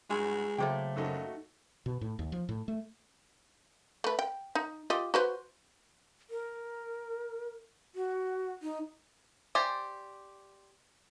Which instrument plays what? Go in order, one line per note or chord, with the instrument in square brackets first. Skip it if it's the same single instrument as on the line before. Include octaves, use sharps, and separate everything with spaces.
[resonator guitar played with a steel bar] G2 F#3 G#5 [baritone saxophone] G#3
[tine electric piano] C#3 F#3 C5 [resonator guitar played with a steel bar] A3 A#3 G5
[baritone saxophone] F#2 [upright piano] D#4 F#4 A4
[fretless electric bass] B2
A2
D#2
F3
A2
A3
[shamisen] A3 B4
G5
D#4
F4 G4 D#5
F#4 B4 C5
[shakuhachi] A#4
F#4
D#4
[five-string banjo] G4 C5 D5 G#5